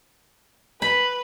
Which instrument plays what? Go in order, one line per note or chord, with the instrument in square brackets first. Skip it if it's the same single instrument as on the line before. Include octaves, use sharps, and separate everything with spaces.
[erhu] B4 [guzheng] B5